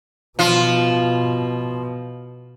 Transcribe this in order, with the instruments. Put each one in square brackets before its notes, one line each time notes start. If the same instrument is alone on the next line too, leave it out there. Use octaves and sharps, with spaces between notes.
[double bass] B2 [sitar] F3 F4